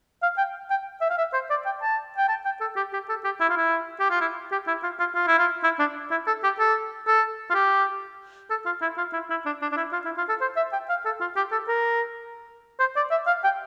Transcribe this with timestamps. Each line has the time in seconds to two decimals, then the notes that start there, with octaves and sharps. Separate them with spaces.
0.22 F5
0.37 G5
0.70 G5
1.01 E5
1.10 F5
1.18 E5
1.33 C5
1.50 D5
1.66 G5
1.82 A5
2.18 G5
2.29 A5
2.45 G5
2.61 A4
2.76 G4
2.93 G4
3.09 A4
3.25 G4
3.41 E4
3.50 F4
3.56 E4
4.00 G4
4.10 F4
4.21 E4
4.52 G4
4.67 E4
4.83 F4
4.99 F4
5.15 F4
5.27 E4
5.39 F4
5.64 E4
5.79 D4
6.11 E4
6.27 A4
6.44 G4
6.59 A4
7.07 A4
7.50 F4
7.55 G4
8.50 A4
8.66 F4
8.82 E4
8.97 F4
9.13 E4
9.30 E4
9.46 D4
9.62 D4
9.72 D4
9.77 E4
9.93 F4
10.05 E4
10.18 F4
10.29 A4
10.41 C5
10.56 E5
10.73 G5
10.89 F5
11.05 A4
11.21 F4
11.36 G4
11.52 A4
11.68 A#4
12.80 C5
12.96 D5
13.11 E5
13.27 F5
13.44 G5